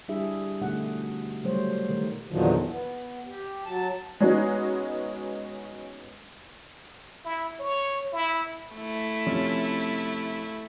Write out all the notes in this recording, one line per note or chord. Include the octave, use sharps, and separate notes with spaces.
G3 D4 E4 G4 G#4 E5
B2 D3 A3 D#4 G#4 F#5
C#3 F#3 G3 A3 C5 C#5
B2 D#3 A3 G4 A#4
E2 A#2 D3 D#3 F3 F#3
B3
G4
F#3 A5
G#3 B3 C#4 D#4 F#4
E4
C#5
E4
A3 E4
C3 F3 C#4